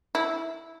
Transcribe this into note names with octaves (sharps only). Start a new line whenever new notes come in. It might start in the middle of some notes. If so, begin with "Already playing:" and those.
E4